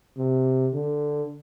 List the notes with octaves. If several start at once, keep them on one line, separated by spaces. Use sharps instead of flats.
C3
D3